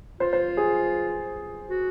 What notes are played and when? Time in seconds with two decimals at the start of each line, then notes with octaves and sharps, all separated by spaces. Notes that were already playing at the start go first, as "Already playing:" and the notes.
0.20 F4 C5
0.33 C5
0.57 G#4
1.68 F#4